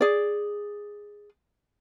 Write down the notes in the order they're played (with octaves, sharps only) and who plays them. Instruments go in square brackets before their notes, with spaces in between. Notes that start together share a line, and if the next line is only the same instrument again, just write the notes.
[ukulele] G#4 D5